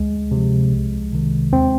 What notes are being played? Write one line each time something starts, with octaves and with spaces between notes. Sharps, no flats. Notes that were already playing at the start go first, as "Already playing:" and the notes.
Already playing: D2 G#3
C3
F3
C2
C3 D#3
D#2 C4